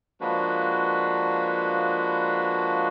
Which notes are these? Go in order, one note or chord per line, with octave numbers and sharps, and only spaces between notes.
F3 G#3 A#3 D4 F#4 B4